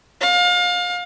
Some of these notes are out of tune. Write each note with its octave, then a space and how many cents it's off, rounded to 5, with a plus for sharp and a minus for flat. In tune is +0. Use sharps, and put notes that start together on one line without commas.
F5 +30